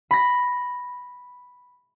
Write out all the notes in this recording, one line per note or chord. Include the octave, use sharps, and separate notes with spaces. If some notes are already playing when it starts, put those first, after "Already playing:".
B5 A#6